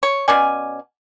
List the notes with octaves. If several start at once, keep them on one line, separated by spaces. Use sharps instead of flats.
C#5
B2 C#4 D5 G#5